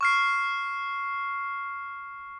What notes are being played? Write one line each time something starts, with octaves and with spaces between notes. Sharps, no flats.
C#6 F6 C7